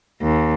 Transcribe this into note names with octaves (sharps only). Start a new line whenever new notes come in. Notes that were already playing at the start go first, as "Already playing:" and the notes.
D#2